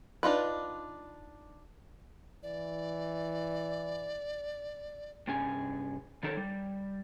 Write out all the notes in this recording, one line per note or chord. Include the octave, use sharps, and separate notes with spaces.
D4 D#4 F4 B4
E3 D5
G2 C3 C#4 G#4 G#5
D#3 D#4 A4 A#4 C#5
G3